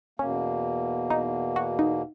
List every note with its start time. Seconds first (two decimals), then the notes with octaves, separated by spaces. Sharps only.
0.19 E2 B2 A#3 C#4
1.10 D#4
1.56 F#4
1.79 D#4